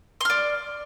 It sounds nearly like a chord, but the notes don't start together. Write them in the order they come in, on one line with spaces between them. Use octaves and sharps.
C6 F6 D5